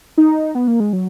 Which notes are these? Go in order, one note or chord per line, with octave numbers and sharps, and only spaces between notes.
D#4
B3
A#3
G#3
F#3